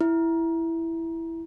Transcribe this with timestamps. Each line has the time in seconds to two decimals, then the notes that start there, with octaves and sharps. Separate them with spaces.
0.01 E4